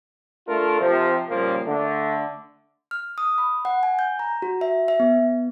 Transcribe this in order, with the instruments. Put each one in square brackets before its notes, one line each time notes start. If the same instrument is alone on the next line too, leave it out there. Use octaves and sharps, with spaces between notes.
[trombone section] A3 D4 F4 A4 A#4
C3 F3
A#2 C#3 F3 G3 A#3
D3 A3
[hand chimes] F6
D#6
B5
F#5
G#5
G6
A#5
F#4
E5
E5
B3